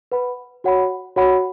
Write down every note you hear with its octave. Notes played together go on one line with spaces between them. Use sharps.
B4 F#5 B5
F#4 C#5 F#5 B5
F#4 C#5 F#5 B5